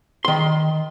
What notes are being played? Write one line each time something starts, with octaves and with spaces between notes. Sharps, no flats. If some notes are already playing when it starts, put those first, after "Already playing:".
D#3 C6